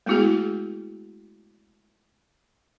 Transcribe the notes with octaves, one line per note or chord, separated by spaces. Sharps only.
G#3 A3 B3 E4 F#4 G#4